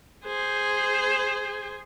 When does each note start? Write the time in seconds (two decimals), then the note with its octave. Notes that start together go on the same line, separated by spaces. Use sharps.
0.25 G#4 C5